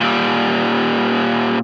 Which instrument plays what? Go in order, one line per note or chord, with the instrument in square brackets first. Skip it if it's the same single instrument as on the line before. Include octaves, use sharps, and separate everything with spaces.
[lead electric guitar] A#2 G3